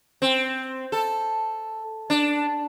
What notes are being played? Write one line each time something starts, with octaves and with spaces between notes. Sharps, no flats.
C4
A4
D4